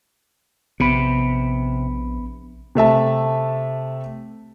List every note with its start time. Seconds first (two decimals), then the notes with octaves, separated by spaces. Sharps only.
0.80 A#1 C3 B3 B5
2.75 C3 A3 E5 A5